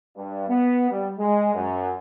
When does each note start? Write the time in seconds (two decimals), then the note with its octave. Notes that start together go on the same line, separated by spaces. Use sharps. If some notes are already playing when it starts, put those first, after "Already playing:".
0.17 G2
0.48 B3
0.90 G3
1.19 G#3
1.54 F#2